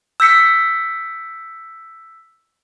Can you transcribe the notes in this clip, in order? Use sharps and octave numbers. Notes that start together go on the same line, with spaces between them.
E6 G6 B6 C#7